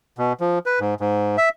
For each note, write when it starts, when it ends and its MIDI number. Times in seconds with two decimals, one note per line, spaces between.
0.18 0.33 47
0.40 0.59 53
0.66 0.79 71
0.80 0.94 44
1.00 1.37 44
1.38 1.49 76